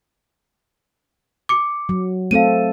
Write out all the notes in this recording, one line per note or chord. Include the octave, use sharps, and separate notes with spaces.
D6 C#7
F#3
A3 C4 A4 F5 D#7